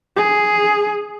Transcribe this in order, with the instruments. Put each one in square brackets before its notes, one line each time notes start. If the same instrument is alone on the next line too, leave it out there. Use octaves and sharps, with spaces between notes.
[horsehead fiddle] G#4